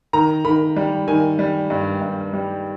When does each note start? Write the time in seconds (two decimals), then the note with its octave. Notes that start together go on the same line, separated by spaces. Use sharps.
0.13 D#3 A#5
0.45 D#3 B5
0.76 G3
1.08 D#3 G#5
1.39 G3
1.70 G2
2.01 G2
2.34 G3